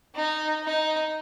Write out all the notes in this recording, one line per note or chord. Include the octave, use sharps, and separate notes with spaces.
D#4
D#4